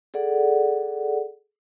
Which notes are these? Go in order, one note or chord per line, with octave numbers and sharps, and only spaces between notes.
G#4 A4 D5 F#5